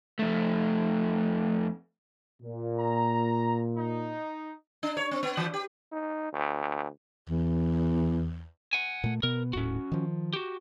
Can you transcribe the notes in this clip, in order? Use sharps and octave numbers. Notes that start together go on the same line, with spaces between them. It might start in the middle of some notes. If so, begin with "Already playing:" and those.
F2 A3
A#2
A#5
D#4
D4
C#5
C4
B3
E3
G4
D#4
D2
E2
F#5 G#5
A#2 A3
B2 B3 A#4
D#1 A2 C#4 F#4
D#3 F3
F#4 G4